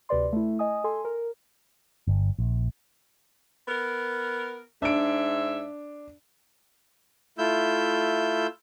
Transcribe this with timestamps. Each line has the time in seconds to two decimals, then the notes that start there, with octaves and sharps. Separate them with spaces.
0.09 D2 C3 B4 D5 C6
0.33 A3 E4
0.59 D#5 G#5 D#6
0.84 A4 G#5 C6
1.05 A#4
2.07 G1
2.39 A#1
3.68 B3 A#4
4.82 G#2 D4 E5 D7
7.38 A3 E4 F4 E6 G6